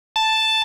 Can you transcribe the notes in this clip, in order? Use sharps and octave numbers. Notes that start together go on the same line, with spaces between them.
A5